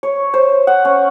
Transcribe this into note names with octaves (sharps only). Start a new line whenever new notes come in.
C#5
C5
F#5
C#4